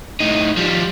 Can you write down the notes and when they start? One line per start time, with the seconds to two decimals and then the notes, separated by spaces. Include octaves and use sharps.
0.20 A2 D#4
0.57 F3 G3